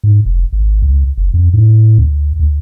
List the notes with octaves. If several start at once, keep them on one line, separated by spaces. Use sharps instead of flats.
G#2
F1
G#1
C#2
F#1
F2
A2
D2
D2